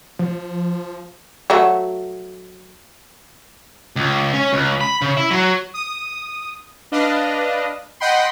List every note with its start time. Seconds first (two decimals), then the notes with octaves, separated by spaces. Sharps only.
0.19 F3
1.50 F#3 A3 F#4
3.96 C#2
4.33 C#4
4.53 C#2
4.81 B5
5.02 C#3
5.17 E4
5.31 F#3
5.74 D#6
6.92 D4 B4 D#5 F5
8.00 D#5 F#5 G5 B5 C6